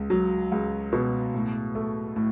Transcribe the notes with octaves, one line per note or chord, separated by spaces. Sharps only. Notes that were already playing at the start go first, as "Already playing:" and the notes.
Already playing: C#2
F#3
C#2
B2
A2
A3
A2